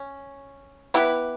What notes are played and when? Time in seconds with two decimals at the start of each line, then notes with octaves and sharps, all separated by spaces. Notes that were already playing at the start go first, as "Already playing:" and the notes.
Already playing: C#4
0.94 B3 E4 G4 B4